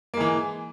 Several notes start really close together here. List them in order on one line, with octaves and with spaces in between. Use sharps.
A#3 G#3 E3